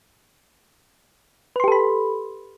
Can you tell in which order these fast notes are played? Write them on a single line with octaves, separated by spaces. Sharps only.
B4 C6 G4 A4 B5